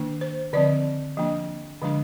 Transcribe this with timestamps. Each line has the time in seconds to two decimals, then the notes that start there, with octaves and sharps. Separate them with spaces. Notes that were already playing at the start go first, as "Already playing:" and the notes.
Already playing: D#3 A#3 D4
0.21 C5
0.53 D3 F3 C4 D5
1.17 F3 A#3 D4
1.82 D3 F3 G#3 D4